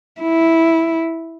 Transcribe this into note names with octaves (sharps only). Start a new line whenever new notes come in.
E4